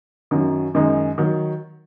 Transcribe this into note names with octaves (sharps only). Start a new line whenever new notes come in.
F#2 D#3 F#3
F#2 D#3 G#3 D#4
D#3 F#3